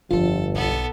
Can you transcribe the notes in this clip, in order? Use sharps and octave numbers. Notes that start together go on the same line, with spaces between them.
G1 F2 F3 F4 A4
B1 B3 A4